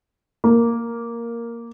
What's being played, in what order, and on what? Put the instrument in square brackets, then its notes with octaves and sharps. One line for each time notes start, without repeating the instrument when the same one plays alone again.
[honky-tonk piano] A#3